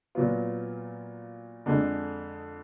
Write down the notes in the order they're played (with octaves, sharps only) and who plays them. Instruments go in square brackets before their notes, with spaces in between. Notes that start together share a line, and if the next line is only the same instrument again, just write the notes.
[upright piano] A#2 F#3 B3 F4
F2 D3 G#3